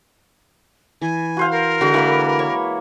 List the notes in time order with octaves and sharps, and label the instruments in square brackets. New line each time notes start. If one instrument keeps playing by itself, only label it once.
[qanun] E3 [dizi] G#5
[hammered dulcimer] F#4 C5 F5
[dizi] A#4
[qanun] D3 G#3 [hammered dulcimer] F#4
[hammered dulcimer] E3 A#3 B5 [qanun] B4
[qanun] C#5